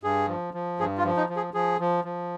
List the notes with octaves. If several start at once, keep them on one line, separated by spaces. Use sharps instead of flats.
G2 G#4
F3
F3
G2 G#4
F4
F3
D#4
F3
G#4
F3 G#4
F3
F3